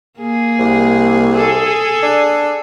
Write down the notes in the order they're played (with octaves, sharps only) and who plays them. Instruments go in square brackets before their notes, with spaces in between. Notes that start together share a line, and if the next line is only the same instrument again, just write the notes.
[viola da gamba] A#3 G#4
[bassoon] C2
[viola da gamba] G#4 A4
[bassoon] D4